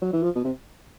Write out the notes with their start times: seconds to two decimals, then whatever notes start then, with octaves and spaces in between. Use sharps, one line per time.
0.02 F#3
0.13 E3
0.23 F3
0.35 B2
0.44 C3